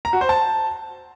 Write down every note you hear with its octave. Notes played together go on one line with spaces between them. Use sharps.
A#5
F#4
C5
A5